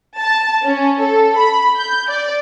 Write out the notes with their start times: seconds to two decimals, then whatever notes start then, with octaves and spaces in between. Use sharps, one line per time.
0.19 A5
0.63 C#4
1.01 A4
1.37 B5
1.78 G6
2.09 D5